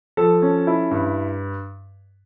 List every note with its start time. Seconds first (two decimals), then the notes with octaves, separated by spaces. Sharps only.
0.17 F3 A4
0.42 C#4
0.67 E4
0.91 G2